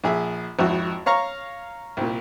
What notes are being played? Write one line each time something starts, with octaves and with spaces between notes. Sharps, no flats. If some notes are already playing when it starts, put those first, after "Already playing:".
A#1 G#4 E5
G#1 F2 E4 F#4
C#5 F5 A#5 C#6
C2 A#2